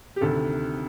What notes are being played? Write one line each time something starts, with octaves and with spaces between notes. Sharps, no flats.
G4
D2 C3 D#3 A4